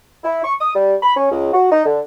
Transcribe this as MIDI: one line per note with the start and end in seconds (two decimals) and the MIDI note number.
0.24 0.43 64
0.43 0.54 85
0.60 0.72 87
0.75 0.95 55
1.03 1.16 83
1.16 1.28 61
1.31 1.51 37
1.53 1.71 66
1.72 1.84 63
1.85 2.00 50